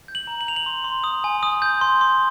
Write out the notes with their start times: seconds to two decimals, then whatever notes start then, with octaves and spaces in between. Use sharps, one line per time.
0.08 G6
0.15 F#7
0.27 A#5
0.41 F#7
0.46 G6 F7
0.56 F#7
0.66 C6
0.84 C6
1.04 D#6
1.24 G#5
1.43 D#6
1.62 G6
1.81 C6
2.01 C6